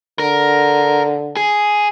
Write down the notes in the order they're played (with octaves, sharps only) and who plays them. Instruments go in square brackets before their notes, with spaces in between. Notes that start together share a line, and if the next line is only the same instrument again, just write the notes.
[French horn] D3 [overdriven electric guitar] A#4
[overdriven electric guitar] G#4